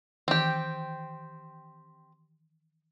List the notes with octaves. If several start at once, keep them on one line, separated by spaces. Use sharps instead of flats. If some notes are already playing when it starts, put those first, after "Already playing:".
D#3 E3 C4 G4